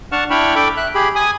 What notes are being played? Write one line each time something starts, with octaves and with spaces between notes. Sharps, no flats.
D4 F#5 A5 C#6 F6
D4 E4 G5 B5 C#6 F6
A4 G5 B5 D6
E5 F#6
G4 G#4 B5
G#5 D#6